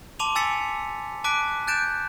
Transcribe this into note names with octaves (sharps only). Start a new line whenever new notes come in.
A5 C6 D6 D#7 F7
G#5 E6 A6 B6 C#7
A5 D6 F#6 B6 D7
F#6 G6 A6 D7 E7